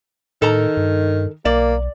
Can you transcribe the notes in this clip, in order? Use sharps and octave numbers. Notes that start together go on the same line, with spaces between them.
A2 D#3 A4 A#4 A#5
G2
B1 A#3 D5